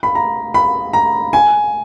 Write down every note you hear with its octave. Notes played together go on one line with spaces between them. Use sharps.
B5
A#5
B5
A#5
G#5